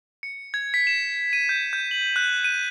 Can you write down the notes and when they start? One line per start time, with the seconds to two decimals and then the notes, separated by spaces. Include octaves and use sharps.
0.23 C#7
0.54 G#6
0.74 B6
0.87 E7
1.33 D#7
1.49 G6
1.73 G6
1.91 F#7
2.16 F#6
2.44 D#7